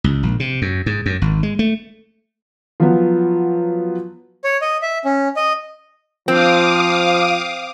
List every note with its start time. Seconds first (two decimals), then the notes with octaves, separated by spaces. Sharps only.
0.04 C#2
0.23 A#1
0.40 C3
0.62 F#2
0.86 G#2
1.06 F#2
1.22 G#1
1.43 G#3
1.59 A3
2.80 F3 F#3 B3
4.44 C#5
4.62 D#5
4.82 E5
5.05 C#4
5.36 D#5
6.28 F3 C4 F5 D6 D#6